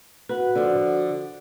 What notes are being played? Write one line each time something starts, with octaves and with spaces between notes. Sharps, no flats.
F#4 B4 F#5
D3 F3 F4